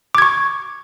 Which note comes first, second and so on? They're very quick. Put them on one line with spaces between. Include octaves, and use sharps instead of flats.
D6 G#6 C#6